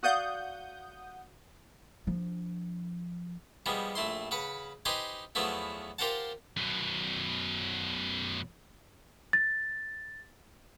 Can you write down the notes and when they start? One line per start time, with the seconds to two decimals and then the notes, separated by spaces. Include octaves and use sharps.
0.03 F#4 D5 F5 F#5 D#6 G6
2.07 F3 D4
3.66 F3 G3 G#3 B3
3.95 A#1 A3 E4 C6
4.31 C#3 B4 F#5 B5
4.85 D#4 G4 B4 C5 G#5 C6
5.35 E2 F3 F#3 A3 B3 E4
5.98 F4 G4 A#4 C5 F#5 A5
6.57 F#2 B2
9.33 A6